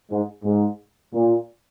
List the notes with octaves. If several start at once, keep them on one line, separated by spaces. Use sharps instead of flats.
G#2
G#2
A#2